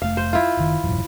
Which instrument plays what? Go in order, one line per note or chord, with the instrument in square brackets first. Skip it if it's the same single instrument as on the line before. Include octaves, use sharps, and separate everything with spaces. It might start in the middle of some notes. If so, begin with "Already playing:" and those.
[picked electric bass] F1 A3 [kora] F5
[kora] C5
E4 F4
[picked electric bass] F#1 D#3
E1 A1 F#2